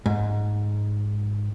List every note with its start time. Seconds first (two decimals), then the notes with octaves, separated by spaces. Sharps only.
0.06 G#2